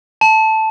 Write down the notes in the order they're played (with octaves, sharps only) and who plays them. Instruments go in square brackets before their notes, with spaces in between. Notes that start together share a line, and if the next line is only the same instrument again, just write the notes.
[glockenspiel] A5